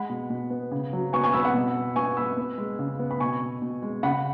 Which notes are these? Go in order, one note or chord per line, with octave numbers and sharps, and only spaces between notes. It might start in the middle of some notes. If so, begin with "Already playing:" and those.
Already playing: G#3 F#5 B5
B2
B2
B3
C#3
F#3
B3 G#5 C#6
G#5 C#6
B3 B5 E6
F#5 B5
B2
B2
B3 G#5 C#6
B3 B5 E6
B3
G#3
C#3
B3
B5
B2 G#5 C#6
B2
B2
G#3
C#3 F#5 B5